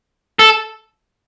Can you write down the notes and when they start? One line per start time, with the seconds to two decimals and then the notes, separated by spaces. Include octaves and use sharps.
0.39 A4